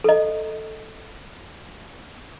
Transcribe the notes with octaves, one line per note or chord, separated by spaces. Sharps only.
A4 D#5